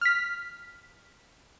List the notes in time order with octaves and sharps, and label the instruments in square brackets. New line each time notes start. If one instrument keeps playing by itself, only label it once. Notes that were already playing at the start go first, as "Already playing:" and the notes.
[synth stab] F6 B6